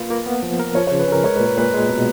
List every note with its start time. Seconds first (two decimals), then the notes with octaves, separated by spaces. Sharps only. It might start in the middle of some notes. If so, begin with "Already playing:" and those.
Already playing: A#3 F4 B4
0.10 A#3
0.26 B3
0.43 F3
0.59 A#4
0.75 F3 C#5
0.87 C#3 C#5
0.99 B4
1.08 C#4 A#4
1.24 G#3 C#5
1.36 A#2 B4
1.46 A#4
1.57 A#2 B4
1.73 G#3
1.89 B2